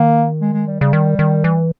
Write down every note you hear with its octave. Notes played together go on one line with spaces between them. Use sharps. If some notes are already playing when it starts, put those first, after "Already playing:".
Already playing: D#3 A#3
G#3
G#3
G3
C#3 G3
D#3
D#3
E3